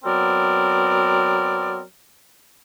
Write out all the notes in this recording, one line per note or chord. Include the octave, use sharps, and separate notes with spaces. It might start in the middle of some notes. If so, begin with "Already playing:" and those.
F#3 B3 C4 A#4 D5